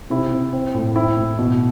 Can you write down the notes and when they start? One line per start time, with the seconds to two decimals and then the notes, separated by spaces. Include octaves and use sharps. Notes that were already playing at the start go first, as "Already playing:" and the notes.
0.10 C3 E4
0.32 C3
0.53 C4
0.74 A2
0.96 C4 E4
1.17 A2
1.39 B2